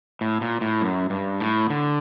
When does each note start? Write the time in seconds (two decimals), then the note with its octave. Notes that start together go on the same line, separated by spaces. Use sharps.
0.21 A2
0.41 A#2
0.61 A2
0.82 F#2
1.10 G2
1.40 A2
1.70 D3